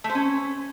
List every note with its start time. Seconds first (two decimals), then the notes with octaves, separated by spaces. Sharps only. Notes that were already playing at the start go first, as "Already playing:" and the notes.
0.04 A3
0.10 C5
0.15 C#4